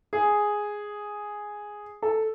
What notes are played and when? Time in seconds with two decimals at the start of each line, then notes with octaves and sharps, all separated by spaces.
0.13 G#4
2.02 A4